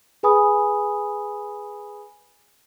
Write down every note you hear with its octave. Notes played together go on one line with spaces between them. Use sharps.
G#4 B4 G#5 B5 D#6